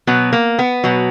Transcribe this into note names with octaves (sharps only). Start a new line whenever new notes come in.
B2 F#3 B3
A#3
B3
B2 F#3